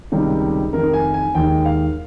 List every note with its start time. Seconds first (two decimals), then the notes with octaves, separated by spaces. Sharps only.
0.12 C#2 C3 D#3 G3
0.73 F1 F2 D#3 A#4
0.93 G#5
1.14 G#5
1.35 D#2 D#3 G#3 G5
1.65 F5